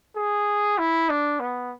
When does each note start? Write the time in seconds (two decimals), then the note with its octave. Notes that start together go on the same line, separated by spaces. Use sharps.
0.16 G#4
0.78 E4
1.09 D4
1.40 B3